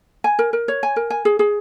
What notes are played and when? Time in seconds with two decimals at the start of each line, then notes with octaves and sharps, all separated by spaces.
0.24 G#5
0.39 A#4
0.53 A#4
0.68 C#5
0.83 G#5
0.96 A#4
1.10 G#5
1.25 G#4
1.39 G#4